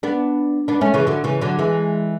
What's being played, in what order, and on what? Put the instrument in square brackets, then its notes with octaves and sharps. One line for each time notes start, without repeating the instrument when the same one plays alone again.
[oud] B3 D4
B3 D4
A3 C#4
C#3 E3
D3 F#3
C#3 E3
D3 F#3
E3 G#3